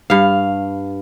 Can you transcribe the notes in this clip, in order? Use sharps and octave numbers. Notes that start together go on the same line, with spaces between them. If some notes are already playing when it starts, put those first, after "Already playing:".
G2 F5